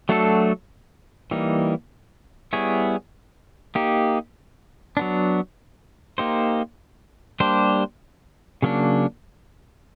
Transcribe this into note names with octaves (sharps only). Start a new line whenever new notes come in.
F#3 A3 D4 F#4 A4
E3 G3 A#3 D#4
G3 B3 E4 G#4 C#5
A#3 D#4 G4
F#3 B3 D4
A#3 D#4 G4 C5
G3 A#3 D4 G4 C5
C#3 F#3 A#3 D4